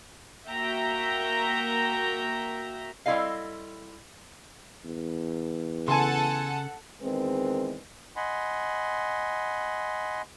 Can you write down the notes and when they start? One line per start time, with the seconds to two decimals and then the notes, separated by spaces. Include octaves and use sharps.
0.46 A#3 F#4 E5 G5 A#5
3.06 G3 C4 E4 A4 D#5 F5
4.84 E2
5.88 C#3 A4 F#5 G#5 A5 C6
7.02 E2 D#3 G#3 C4 A#4 B4
8.16 D#5 F#5 G#5 B5 C6